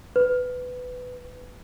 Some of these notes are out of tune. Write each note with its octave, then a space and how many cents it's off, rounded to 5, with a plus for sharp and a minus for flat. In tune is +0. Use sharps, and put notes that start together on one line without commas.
B4 +15